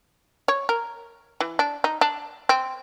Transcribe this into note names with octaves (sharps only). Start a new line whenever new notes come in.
C#5
A#4
E3
D4
D#4
D4
C4